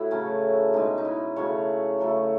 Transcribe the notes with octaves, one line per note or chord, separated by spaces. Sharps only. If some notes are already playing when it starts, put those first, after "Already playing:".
Already playing: A2 E4 F#4 A4
C#3 F#3 A3 C#4
B2 G#3 D#4
D#4
E4
C#3 F#3 A3 C#5
C#3 F#3 A3